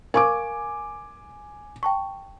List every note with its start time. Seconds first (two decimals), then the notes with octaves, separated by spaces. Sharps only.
0.14 A#4 F5 G#5 C#6 D6
1.83 G5 A5 C#6